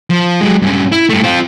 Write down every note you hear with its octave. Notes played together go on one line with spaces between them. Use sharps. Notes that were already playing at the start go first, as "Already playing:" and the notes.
F3
F#3 G#3
G2 C#4
E4
G2 A3
C4 F4